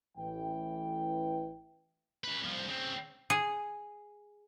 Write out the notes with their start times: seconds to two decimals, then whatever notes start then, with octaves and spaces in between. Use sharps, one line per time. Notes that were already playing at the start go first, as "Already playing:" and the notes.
0.18 A1 E3 G5
2.24 C#3 B4
2.43 C2 F3
2.67 C#3 C4
3.30 G#4